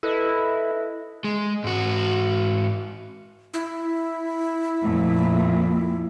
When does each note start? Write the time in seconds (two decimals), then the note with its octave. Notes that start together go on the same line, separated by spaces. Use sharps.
0.03 E4 A4 B4 D#5
1.24 G#3
1.64 G#2 F#4
3.54 E4
4.81 F2 A#2 A3